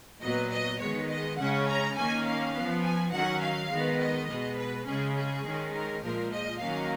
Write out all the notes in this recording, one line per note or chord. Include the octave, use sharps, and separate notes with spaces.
A#2 F#3 B3 D#5
D#5
D#3 G#3 B3 C#5
D#5
C#3 G#3 C#4 F#5
A#5
D#3 A#3 C#4 G#5
F5
F3 B3
G#5
D#3 F#3 C#4 F#5
F5
D#3 G#3 B3
D#5
B2 G#3 B3
B4
C#3 G#3 C#4 G#4
G#4
D#3 G#3 C#4
A#4
A#2 F3 G#3 A#4
D#5
D#3 F#3 A#3 C#4 F5